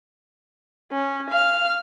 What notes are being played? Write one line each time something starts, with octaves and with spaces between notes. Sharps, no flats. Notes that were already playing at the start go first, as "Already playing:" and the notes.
C#4
F5 F6